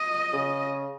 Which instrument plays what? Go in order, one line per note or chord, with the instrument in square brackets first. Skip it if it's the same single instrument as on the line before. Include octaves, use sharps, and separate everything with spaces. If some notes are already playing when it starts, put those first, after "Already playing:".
Already playing: [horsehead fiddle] D#5
[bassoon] C#3